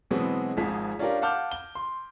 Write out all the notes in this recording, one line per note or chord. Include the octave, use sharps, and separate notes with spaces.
B2 E3 F#3 G#3 B3 C4
G#1 G#2 F3 G#4 B6
C#4 D4 F4 G4 A#4
F5 F#5 A5 D6 F6 G6
G7
C6